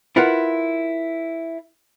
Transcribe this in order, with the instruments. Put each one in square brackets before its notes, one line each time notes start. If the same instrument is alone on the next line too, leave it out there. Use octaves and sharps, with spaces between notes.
[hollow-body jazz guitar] E4 F4 A#4 B4 F#5